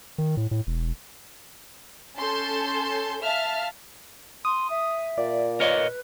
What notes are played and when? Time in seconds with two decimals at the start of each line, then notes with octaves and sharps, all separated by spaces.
0.18 D#3
0.37 A2
0.51 A2
0.67 E1
2.17 C#4 A4 A5 C6 G6
3.21 E5 F5 A5 F6
4.45 C6 D#6
4.70 E5
5.18 A#2 D5
5.60 A#4 B4 C#5 D#5